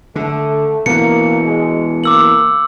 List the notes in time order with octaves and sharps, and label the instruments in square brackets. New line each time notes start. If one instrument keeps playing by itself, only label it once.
[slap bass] D3 [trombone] A3
[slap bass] B2 E3 [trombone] A#3 [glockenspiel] C#7
[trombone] G#3
[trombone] A#3 [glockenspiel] D6 E6 F#7